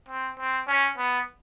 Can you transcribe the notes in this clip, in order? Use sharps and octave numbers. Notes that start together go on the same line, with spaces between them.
C4
C4
C#4
B3